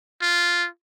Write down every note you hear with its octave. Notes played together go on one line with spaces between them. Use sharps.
F4